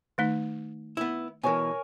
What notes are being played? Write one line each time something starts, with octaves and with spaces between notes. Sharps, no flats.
D#3 A3 D#4
B3 E4
B2 E3 A#4 C#5 G#5